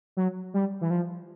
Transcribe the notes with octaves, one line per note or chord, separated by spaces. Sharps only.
F#3
G3
E3
F3